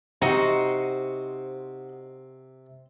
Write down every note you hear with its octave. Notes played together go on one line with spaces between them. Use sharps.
C3 D#4 F#4 C5